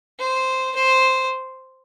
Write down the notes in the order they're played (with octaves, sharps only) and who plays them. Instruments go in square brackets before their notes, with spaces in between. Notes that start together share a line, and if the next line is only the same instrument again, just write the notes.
[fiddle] C5
C5